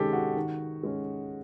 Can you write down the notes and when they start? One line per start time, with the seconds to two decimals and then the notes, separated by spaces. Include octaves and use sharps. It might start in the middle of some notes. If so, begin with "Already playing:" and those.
Already playing: C3 D#3 G#3 C#4 G4 A4
0.13 F#4
0.36 D#3
0.83 G#3 C#4